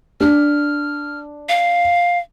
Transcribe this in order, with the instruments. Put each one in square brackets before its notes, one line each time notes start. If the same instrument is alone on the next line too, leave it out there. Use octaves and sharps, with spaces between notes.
[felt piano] D4 [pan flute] F6
[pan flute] F5